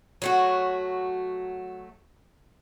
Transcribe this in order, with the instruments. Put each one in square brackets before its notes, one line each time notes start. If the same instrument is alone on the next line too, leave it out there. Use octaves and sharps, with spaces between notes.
[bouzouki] F#3 A3 F#4